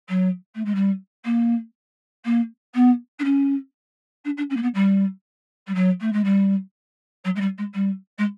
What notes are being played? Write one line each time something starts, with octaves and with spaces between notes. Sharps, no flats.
F#3
A3
G#3
G3
A#3
A#3
B3
D4
C#4
D4
D4
C#4
A#3
B3
G3
G3
F#3
A3
G#3
G3
F#3
G#3
G3
G#3
G3
G#3